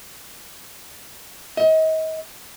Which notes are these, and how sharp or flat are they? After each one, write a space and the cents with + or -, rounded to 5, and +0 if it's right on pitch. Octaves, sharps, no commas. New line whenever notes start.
D#5 +35